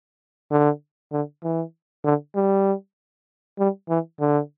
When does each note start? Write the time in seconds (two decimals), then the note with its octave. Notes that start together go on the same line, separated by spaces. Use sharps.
0.51 D3
1.13 D3
1.44 E3
2.05 D3
2.36 G3
3.59 G3
3.89 E3
4.20 D3